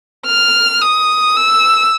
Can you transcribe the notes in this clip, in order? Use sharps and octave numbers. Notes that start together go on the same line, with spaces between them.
F6
D#6
E6